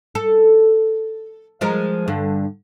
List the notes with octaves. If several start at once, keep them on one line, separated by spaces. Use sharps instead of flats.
A4
F3 G#3 A#4
G2 D3